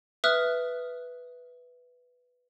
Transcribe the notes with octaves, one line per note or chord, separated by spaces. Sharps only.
B4 E5 D#6 F6 F#6